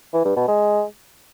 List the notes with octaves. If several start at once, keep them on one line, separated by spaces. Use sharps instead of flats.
E3
G2
B2
G#3